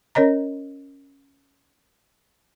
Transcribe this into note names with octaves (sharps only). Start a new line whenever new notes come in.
C#4 A#4 C#5 D#5 A#5